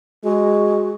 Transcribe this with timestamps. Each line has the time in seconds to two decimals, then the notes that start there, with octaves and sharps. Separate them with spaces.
0.24 G#3 F#4